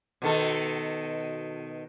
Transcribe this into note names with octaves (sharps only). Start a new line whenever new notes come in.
B2 D#3 A4